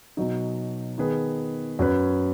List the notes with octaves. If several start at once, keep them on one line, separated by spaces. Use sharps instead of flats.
B2 F#3 D#4
D#3 B3 G#4 B4
F#2 F#3 C#4 B4